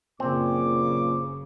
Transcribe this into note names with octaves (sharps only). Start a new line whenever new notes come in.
F#1 A#2 C#3 C4 D6